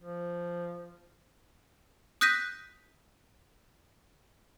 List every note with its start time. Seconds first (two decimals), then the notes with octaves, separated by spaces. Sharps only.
0.01 F3
2.21 D#6 F#6 G6 A#6 B6 D#7